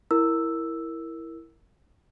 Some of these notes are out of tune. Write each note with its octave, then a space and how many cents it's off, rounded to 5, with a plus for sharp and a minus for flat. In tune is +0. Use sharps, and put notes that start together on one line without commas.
E4 +0 A#4 +0 E6 +0